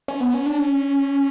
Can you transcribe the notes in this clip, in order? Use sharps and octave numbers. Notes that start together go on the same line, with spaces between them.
C#4
B3
C#4
D4
C#4